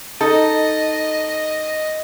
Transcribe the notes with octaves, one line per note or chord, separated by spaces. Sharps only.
D#4 A4 D#5